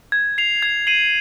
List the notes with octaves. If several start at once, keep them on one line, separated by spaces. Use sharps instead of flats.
G#6
C7 F7
G#6
C7 D#7 F#7